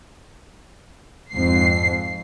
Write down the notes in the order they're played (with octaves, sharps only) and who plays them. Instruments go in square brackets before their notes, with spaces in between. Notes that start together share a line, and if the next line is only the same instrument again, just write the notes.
[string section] F2 G#2 C7